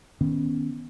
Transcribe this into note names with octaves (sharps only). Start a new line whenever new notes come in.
D#3 B3 C#4